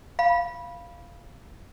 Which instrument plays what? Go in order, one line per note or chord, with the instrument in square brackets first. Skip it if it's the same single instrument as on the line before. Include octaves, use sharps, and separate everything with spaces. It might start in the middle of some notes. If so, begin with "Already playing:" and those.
[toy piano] F5 B5